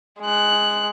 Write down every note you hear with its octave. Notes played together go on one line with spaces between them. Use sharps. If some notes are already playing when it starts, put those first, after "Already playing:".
G#3 F#6